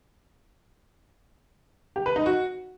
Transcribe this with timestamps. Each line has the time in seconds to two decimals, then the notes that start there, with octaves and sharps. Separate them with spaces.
1.96 G4
2.06 B4
2.16 D#4
2.26 F#4